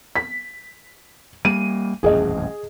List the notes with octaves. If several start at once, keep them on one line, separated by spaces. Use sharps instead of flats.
B6
G3 A#3 D#7
D#1 A1 F2 G#4 D#5